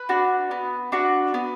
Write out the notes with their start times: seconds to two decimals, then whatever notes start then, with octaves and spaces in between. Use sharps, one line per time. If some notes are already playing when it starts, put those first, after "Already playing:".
Already playing: B4
0.09 D4 F#4
0.51 B3
0.92 D4 F#4
1.34 B3